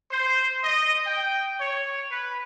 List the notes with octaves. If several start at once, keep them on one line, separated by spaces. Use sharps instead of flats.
C5
D#5
G5
C#5
B4